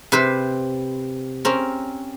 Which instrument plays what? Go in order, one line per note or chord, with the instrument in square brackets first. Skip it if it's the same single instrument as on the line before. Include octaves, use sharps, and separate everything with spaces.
[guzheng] C3 B4 C5 B5
C4 C#4 A#4